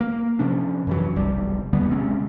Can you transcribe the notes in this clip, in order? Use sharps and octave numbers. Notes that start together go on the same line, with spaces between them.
A#3
C3 F3 C#4 D4
F#2 E3 F#3
F1 B1 G3
E2 D3 G3 B3
C3 G#3 C4 C#4